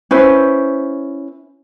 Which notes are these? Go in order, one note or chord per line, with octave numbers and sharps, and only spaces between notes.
C#4 E4 B4 C5